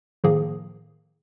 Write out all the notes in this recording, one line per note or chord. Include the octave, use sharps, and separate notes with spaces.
A2 D#3 F3 A#3 G#4